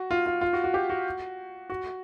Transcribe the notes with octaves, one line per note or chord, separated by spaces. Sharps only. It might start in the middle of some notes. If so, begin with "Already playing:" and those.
Already playing: F#4
F4
F4
F4
F#4
F#4
G4
F#4
F#4